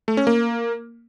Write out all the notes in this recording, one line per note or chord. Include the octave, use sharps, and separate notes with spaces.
A3
C#4
A#3